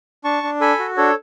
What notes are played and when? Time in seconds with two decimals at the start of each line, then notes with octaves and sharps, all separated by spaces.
0.24 D4 A5 C#6
0.43 D4
0.61 A4 G#5 B5
0.79 F#4
0.97 D4 A4 C#5